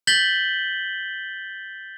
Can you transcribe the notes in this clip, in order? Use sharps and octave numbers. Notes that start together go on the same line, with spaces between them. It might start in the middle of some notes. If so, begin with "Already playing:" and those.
G6 A6 B6 F#7 G7